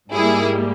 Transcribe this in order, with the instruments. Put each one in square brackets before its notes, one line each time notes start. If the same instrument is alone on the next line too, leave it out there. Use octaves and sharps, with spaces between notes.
[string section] G#2 G3 A#3 E4 G#4